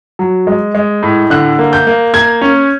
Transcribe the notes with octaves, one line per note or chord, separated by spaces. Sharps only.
F#3
G#3
G#3
A2
D3 F#6
A#3
G6
A#3
A#3 G#6
C#4